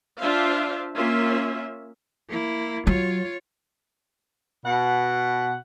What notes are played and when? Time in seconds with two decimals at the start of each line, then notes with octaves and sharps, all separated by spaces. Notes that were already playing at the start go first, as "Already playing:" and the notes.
0.19 D4 F4 C5 E5 F5
0.95 A#3 C#4 F4 E5
2.29 A#3 E4
2.87 F#3 F4 C#5
4.65 B2 F#5